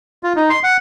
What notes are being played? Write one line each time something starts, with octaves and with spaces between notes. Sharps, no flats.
F4
D#4
C6
F#5